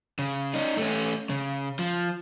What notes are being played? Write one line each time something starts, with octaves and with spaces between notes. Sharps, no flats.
C#3
C#4 D#4
A3 C#4
C#3
F3